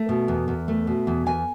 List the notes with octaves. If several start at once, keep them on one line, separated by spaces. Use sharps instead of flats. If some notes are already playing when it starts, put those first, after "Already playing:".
Already playing: A3
B2
E2
E2
A3
B2
E2
E2 G#5